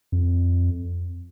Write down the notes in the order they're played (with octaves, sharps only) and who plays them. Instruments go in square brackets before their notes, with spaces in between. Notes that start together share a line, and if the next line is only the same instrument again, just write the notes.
[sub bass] F2